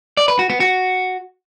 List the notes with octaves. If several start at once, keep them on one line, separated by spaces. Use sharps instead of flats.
D5
B4
F#4
B3
F#4